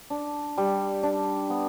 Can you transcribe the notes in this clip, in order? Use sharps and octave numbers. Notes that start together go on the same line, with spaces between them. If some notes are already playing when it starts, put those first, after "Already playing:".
D4
G3
D4
B3